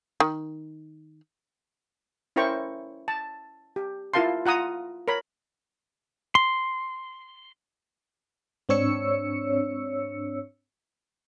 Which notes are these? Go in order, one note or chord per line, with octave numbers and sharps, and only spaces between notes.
D#3
C#4 E4 A#4 C5 G5 C#6
A5
G4
E4 F4 A#4 F5 A5 C6
F4 F#5 A#5 D#6
A#4 C#5 B5
C6
G#2 C4 D4 C#5 E6 C#7